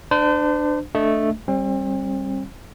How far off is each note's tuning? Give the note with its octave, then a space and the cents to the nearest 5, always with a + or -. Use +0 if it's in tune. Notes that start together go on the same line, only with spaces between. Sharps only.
D4 +20 C5 -40
A3 +0 D4 +0 D#5 +0
G3 +0 C4 +40